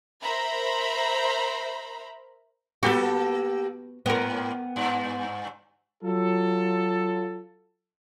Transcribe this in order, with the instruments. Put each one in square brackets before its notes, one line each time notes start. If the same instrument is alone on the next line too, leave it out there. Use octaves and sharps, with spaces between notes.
[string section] A#4 C5 E5 A#5 B5
[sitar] A#3 G4 A4 [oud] B3 F#4
[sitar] G#2 [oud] B3 A#4
[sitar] G2
[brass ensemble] F#3 F4 A4